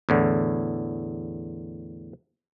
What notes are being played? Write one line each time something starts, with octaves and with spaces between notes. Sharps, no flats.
E2 A2 D3